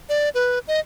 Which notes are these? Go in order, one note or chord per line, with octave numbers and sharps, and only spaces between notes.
D5
B4
D#5